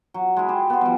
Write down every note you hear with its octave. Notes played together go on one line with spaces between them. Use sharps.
F#3
G#3 E4
G4 C5
B3 C6
F3 G3